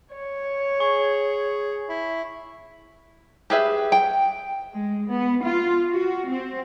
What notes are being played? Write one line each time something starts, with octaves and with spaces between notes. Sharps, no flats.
C#5
G#4 C#6
E4
G4 G#4 B4 E5
G5
G#3
B3
F4
F#4
C4